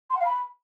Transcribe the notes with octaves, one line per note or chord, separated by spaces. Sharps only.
C6
F#5
F5
B5